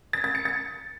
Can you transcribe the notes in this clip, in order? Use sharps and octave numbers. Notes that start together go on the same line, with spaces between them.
A6
A6
C#7
A6